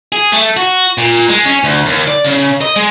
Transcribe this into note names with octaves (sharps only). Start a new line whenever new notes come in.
G#4
A3
F#4
A#2
G#3
C#4
D2
D#2
D5
C#3
D#5
G#3